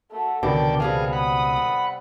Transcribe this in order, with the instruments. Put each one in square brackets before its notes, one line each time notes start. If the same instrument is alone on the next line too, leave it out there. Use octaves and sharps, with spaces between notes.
[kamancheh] A3 F#4
[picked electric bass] C#2 B2 [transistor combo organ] D3 D5 G5 [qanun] D#3 [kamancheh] A5
[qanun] C3 G3 B3 [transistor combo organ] G#4 F5
[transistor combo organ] F#5 B5 [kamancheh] D#6
[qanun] D5